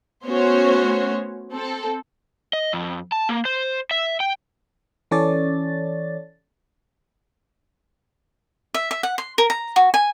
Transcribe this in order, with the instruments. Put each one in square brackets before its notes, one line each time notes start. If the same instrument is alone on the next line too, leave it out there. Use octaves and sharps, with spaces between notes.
[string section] A3 B3 C#4 F#4 C5 C#5
C4 A4
[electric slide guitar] D#5
F2
A5
A#3
C5
E5
G5
[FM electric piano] E3 C#4 A4 C#5 D5 A6
[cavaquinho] E5
E5
F#5
C6
A#4
A#5
F#4
G#5